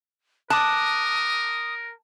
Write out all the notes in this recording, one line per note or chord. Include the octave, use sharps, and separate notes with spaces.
A#4 A5 D6 D#6 F#6